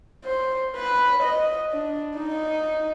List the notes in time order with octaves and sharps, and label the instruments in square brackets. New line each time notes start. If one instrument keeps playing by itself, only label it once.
[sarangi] C5
B4
D#5
D4
D#4